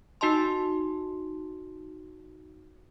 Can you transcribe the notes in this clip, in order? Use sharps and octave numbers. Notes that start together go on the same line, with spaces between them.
D#4 F#4 D#5 A5 C6